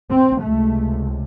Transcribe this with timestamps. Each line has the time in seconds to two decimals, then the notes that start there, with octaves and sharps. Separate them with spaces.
0.09 C4
0.40 C#2 C3 A3